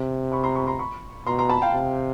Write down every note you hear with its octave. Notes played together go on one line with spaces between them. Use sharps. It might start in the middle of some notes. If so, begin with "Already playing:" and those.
Already playing: C3
B5 C#6
A#5 C6
B5 C#6
A#5 C6
B5 C#6
B2 A#5 C6
A#5 C6
A5 B5
F5 G5
C3